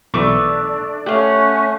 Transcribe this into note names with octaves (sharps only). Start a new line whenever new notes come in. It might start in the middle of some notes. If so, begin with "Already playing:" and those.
B1 E3 A3 B3 D4 E5 D6
A3 C#4 G4 F5 F#5